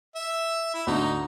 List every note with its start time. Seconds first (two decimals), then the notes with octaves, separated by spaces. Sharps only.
0.15 E5
0.74 E4
0.87 D2 D#4